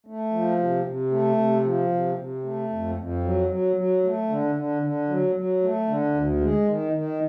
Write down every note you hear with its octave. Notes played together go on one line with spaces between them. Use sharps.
A3
F3
C3
C3
A3
C3
F3
C3
C3
A3
F2
F2
F#3
F#3
F#3
A3
D3
D3
D3
F#3
F#3
A3
D3
D2
G#3
D#3
D#3